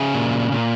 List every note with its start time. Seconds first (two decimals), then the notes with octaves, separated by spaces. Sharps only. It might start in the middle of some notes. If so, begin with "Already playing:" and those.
Already playing: C#3 E5
0.14 A#2
0.52 A#2